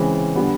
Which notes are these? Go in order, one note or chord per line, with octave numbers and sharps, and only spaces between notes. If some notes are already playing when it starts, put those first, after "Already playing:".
Already playing: C#3 E3 G#3 C4
D3 G3 B3